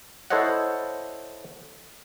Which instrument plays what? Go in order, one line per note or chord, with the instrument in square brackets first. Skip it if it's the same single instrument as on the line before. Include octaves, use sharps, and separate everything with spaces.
[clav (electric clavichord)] E4 A4 C5 C#5 D#5 F#5